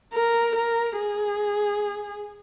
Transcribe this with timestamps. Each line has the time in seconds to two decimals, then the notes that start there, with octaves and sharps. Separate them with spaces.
0.14 A#4
0.55 A#4
0.98 G#4